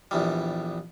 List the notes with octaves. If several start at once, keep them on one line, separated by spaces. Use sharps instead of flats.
A#1 E2 G3